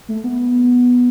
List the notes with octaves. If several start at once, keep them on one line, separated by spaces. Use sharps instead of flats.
A3
B3